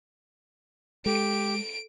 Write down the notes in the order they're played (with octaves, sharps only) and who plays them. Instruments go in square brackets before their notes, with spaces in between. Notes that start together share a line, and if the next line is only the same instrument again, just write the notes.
[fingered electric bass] G#3 [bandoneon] G4 [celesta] A4 [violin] D7